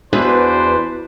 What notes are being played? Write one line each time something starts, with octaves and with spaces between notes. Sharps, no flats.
E2 D4 F#4 B4 C5